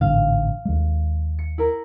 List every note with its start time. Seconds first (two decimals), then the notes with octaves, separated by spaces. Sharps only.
0.01 A1 G#2 D3 F5
0.65 D#2 G#3
1.39 C#7
1.58 E4 A#4